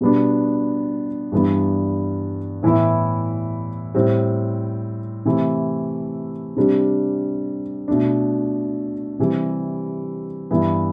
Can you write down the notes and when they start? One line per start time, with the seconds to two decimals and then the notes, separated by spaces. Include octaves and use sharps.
0.01 B2 G3 B3 D4
1.32 G2 E3 G3 B3 D4
2.63 A2 E3 B3 E4
3.95 A2 G3 C4
5.25 C3 E3 A3 E4
6.56 C3 G3 D4
7.88 B2 A3 D4
9.19 C3 E3 G3
10.51 G2 E3 B3 E4